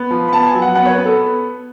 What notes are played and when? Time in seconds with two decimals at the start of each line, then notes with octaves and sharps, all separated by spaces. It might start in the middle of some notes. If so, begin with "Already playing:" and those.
Already playing: B3
0.11 F3
0.28 B5
0.32 B3 A5
0.47 G#5
0.54 F#3
0.62 F#5
0.75 B3 F#5
0.85 C#5
0.91 B4
0.97 B3
1.06 A4